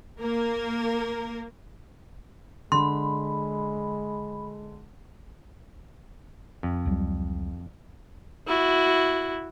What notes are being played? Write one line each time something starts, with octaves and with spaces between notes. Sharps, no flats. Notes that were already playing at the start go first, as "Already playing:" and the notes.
A#3 A#4
D3 G#3 B5 C6
F2
C#2 F#3 G3
E4 F#4